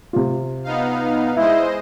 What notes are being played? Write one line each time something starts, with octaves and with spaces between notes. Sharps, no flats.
C3 F4
B3 D#4 F5
G#3 E4 C5 D#5